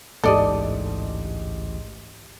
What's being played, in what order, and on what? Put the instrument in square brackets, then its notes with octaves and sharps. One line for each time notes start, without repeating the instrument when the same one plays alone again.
[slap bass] A1 D2 [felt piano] G#2 G4 [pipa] A4 D5 D#5